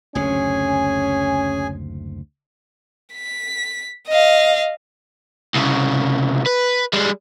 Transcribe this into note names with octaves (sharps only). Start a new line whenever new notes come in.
F#1 D2 C3 C#4 G#4 G#5
B6
D#5 F5
C2 C#3
B4
G3 G#3